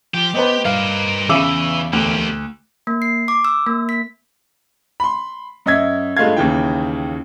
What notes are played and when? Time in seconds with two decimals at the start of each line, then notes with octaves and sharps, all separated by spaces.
0.14 F3 G4
0.34 B3 B4 C5 D#5
0.65 G2 A#4 D5 F5
1.29 E2 C#3 E3 E5 D6 E6
1.93 D2 A#3 G4
2.87 A#3
3.02 C7
3.28 D6
3.45 E6
3.67 A#3
3.89 B6
5.00 B5 C6
5.66 F#2 D#5 E5 G#6
6.17 G2 G#3 A3 F4 F5 G#6
6.37 D#2 C#3 E3 G5